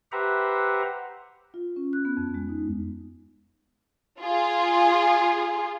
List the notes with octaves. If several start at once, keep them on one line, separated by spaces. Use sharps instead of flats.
G4 B4 C5 E5 F#5 A#5
F4
C#4
F#6
B3
F2
G#3
D#4
F4 G#4